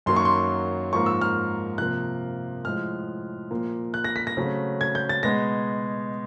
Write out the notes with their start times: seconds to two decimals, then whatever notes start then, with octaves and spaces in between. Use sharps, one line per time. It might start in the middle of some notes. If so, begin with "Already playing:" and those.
0.06 F#2 D#3 F#3 A#3 C6
0.16 C#6
0.25 C6
0.93 G#2 F3 A#3 C#6
1.06 E6
1.21 F6
1.78 C3 F3 A#3 F#6
2.65 A2 F3 G#3 F6
3.51 A#2 F3 A#3
3.94 F#6
4.04 A#6
4.16 B6
4.27 A#6
4.37 C#3 F#3 A3 C4
4.81 G#6
4.95 G6
5.09 A6
5.23 B2 G#3 B3 A#6